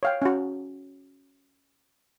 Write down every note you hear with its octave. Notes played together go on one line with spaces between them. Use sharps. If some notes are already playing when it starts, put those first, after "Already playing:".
C#5 F5 G5
C#4 F#4